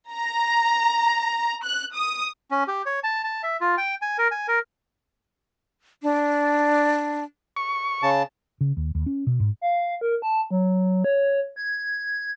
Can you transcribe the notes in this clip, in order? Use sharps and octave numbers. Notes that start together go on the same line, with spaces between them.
A#5
F#6
D#6
C#4
G4
C#5
A5
A5
E5
F4
G5
G#5
A#4
G#5
A#4
D4
C#6
C#3 A5
C#3
D#2
D#2
C#4
B2
G#2
F5
A#4
A5
F#3
C#5
G#6